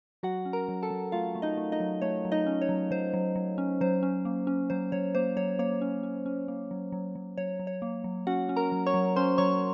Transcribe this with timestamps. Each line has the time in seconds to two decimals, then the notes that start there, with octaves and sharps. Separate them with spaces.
0.23 F#3 F#4 F#5
0.45 C#4
0.53 A#4 A#5
0.68 F#3
0.83 A4 A5
0.90 F#3
1.12 A3 F4 F5
1.35 A3
1.42 D#4 D#5
1.58 A3
1.72 D#4 D#5
1.80 F#3
2.02 A3 C#5
2.25 F#3
2.32 D#4 D#5
2.46 C#4
2.62 C#5
2.69 F#3
2.91 F#3 C5
3.14 F#3
3.36 F#3
3.58 C#4
3.81 F#3 C5
4.03 C#4
4.25 A#3
4.47 C#4
4.70 F#3 C5
4.92 F#3 C#5
5.15 A#3 C5
5.37 F#3 C#5
5.59 A#3 C#5
5.82 C#4
6.03 C#4
6.26 C#4
6.48 A#3
6.71 F#3
6.92 F#3
7.15 F#3
7.38 F#3 C#5
7.59 F#3
7.67 C#5
7.82 A#3
8.04 F#3
8.27 C#4 F#4 F#5
8.49 C#4
8.56 A#4 A#5
8.72 F#3
8.86 C#5 C#6
8.94 F#3
9.16 C#4 C5 C6
9.38 F#3 C#5 C#6